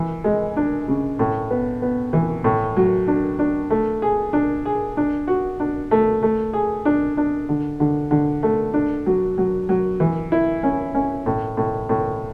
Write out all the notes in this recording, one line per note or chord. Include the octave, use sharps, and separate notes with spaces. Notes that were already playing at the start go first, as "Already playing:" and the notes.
Already playing: E3
G#3
D4
C#3
A2
B3
B3
E3
A2
F#3
D4
D4
A3
G#4
D4
G#4
D4
F#4
D4
A3
A3
G#4
D4
D4
D3
D3
D3
A3
D4
F#3
F#3
F#3
E3
E4
C#4
C#4
A2
A2
A2